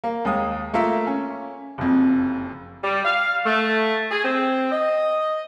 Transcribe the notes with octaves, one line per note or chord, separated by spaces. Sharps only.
A#3
D#2 G#3 D#6
A3 A#3 F4 A#4 E5
C#4
F#1 F2
G3
F5
A3
G#4
C4
D#5